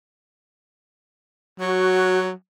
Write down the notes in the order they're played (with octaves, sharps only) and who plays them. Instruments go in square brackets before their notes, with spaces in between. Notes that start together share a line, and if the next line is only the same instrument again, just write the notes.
[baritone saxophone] F#3 [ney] F#4